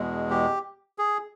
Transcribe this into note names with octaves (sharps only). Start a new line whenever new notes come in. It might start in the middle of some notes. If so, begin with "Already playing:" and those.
Already playing: E2 B2 G#3
G4
G#4